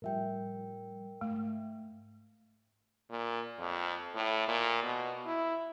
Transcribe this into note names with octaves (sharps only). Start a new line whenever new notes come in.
A2 F3 G3 A#4 E5 G5
G#2 A3
A#2
F2
A2
A#2
B2
E4